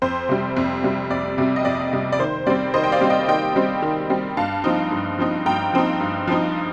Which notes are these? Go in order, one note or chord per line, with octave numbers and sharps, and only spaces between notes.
F2 C5
C3 G3
F2
C3 G3
F2 D5
C3 G3
D#5
F2 D5
C3 G3
D5
D#3 C5
G3 C4 D5
D#3 C5 D#5
G5
D5 F5
G3 C4
D#5 G5
D#3 D#5 G5
G3 C4
D#3
G3 C4
G2 F5 A5
F3 C4 D#4
G2
F3 C4 D#4
G2 G5 A#5
F3 C4 D#4
G2
F3 C4 D#4